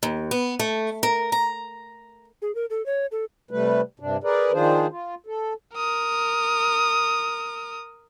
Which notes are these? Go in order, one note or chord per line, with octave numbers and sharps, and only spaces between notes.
D#2
B3
A3
A#4
A#5
G#4
A#4
A4
C#5
A4
C3 G3 A3 B4
G2 C3 D4
G#4 A#4 B4 D5
D#3 F3 D4 F4 G#4 C5
F4
A4
A#4 D#6